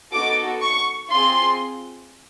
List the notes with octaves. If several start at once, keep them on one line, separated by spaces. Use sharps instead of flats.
B3 D#4 F#4 A4 D6
C#6
C4 F4 G#4 C6